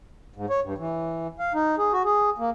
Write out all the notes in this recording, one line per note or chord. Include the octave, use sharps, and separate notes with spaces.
G#2
C#5
G2
E3
F5
D#4
G#4
F#4
G#4
A#3